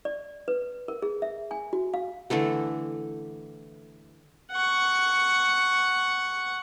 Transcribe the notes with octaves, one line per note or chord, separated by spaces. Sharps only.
D5
B4
A#4
G#4
E5
G#5
F#4
F5
D3 E3 A3 A4
F#5 C#6